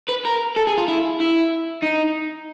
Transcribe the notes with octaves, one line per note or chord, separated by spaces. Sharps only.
B4
A#4
A4
G#4
F4
E4
E4
D#4